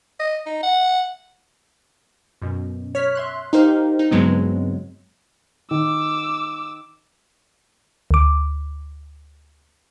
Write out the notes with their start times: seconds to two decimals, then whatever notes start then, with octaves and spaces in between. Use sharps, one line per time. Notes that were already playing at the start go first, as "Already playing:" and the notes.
0.20 D#5
0.46 D#4
0.63 F#5
2.42 F#2 B2
2.95 C#5 F6 B6
3.15 E5 C6 F#6
3.53 D#4 G4 A#4 C5 F5
3.99 D#4
4.11 G2 C#3 F#3 G#3 B3 C4
5.71 D#3 D6 E6
8.11 D2 D6